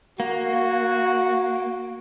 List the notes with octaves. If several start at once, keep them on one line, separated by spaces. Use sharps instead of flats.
A#3 F#4